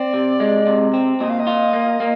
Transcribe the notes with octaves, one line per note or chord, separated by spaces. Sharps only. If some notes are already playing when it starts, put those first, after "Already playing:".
Already playing: C4 D5
C3
G#3
C3
C4
A#2 D#5
F5
D#5
F4
A#3
A#3